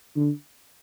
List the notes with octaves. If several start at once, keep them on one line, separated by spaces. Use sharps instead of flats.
D3